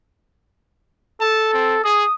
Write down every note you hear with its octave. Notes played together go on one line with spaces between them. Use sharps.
A4 A5
C4
G#4 D#6